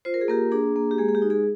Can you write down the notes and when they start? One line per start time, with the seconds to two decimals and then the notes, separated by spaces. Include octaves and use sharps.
0.05 F4 C5
0.14 A#4
0.21 G#4
0.28 A#3 G4 A#4
0.52 D4 G#4
0.76 A#3
0.91 G4
0.98 G#3 G#4
1.08 G#4
1.15 G4
1.22 D#4
1.30 G#4